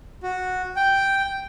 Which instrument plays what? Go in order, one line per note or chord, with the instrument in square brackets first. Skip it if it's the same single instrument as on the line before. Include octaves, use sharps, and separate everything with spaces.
[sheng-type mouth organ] F#4
G5